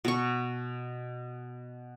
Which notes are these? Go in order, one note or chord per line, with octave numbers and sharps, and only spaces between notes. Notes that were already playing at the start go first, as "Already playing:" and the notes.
B2 C#6